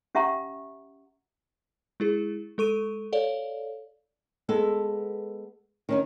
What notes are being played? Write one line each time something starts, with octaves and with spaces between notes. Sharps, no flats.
C#4 G4 E5 F#5 A#5 C#6
G#3 E4 G#4
G#3 A4 C#6 D#7
A4 C#5 D5 F5
G#3 B3 A4
D#3 C#4 D#4